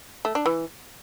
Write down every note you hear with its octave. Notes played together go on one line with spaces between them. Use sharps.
A3
D4
E3